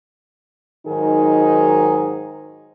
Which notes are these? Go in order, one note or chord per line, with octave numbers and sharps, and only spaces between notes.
G#2 D#3 F#3 D#4 G#4